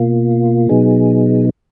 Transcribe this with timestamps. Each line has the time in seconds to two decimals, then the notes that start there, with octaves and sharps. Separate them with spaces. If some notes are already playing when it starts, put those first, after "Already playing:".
Already playing: B2 A#3 F4
0.69 B2 F#3 B3 D#4 G#4